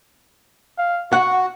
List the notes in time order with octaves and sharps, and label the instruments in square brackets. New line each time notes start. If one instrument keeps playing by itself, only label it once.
[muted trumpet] F5
[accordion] F#4 [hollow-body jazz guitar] F#5 [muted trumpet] C#6